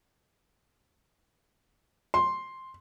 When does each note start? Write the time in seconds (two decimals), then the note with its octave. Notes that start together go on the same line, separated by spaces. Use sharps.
2.14 C6